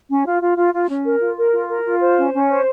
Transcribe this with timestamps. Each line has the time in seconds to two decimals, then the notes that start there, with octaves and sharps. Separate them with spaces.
0.10 C#4
0.26 F4
0.42 F4
0.57 F4
0.73 F4
0.89 C#4
1.05 A#4
1.21 F4
1.37 A#4
1.53 F4
1.69 A#4
1.85 F4
2.01 C5
2.17 C#4
2.33 C#4
2.48 C5